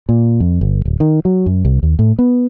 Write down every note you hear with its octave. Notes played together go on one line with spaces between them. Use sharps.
A#2
F2
G1
D1
D#3
F#3
F#2
C2
D#2
A2
B3